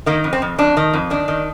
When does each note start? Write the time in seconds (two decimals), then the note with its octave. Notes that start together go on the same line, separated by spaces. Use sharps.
0.06 D#3 A#3
0.24 F2
0.33 C4
0.42 F2
0.58 F2 D4
0.77 D#3
0.93 F2
1.10 D#3 D4
1.28 D#3